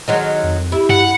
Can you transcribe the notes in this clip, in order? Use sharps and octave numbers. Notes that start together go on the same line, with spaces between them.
D#3 F#3 G#3
F2
E4 G4
G2 F#5